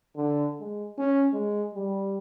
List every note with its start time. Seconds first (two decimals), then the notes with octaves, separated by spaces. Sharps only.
0.17 D3
0.60 G#3
0.98 C#4
1.33 G#3
1.75 G3